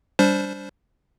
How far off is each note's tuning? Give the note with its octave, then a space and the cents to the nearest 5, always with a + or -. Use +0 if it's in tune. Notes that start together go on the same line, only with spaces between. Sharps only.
G3 +0 D4 -30 C5 +0